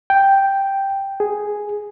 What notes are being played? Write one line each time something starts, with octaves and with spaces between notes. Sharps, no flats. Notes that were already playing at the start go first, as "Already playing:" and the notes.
G5
G#4